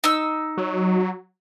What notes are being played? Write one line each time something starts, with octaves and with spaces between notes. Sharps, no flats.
D#4 E6
F#3